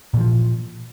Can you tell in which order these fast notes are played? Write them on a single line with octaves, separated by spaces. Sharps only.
A#2 E3 F3